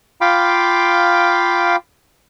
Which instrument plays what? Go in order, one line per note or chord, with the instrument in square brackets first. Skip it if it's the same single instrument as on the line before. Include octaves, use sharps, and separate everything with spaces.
[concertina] F4 F5 G5 B5 D6